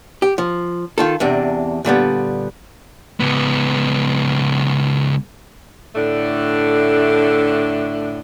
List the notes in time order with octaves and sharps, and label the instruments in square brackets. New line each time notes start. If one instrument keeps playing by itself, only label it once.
[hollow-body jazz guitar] G4
F3
D#3 F4 A4
E2 C3 D4
A#2 D3 G3 B3
[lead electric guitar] C#2 B3
[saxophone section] A2 D3 A3 D4